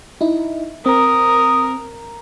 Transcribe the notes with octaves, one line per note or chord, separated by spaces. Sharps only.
D#4 E4
C4 A#4 D#6